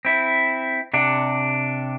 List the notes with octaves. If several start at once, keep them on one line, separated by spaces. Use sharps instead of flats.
C4 E4
C3 D4 F#5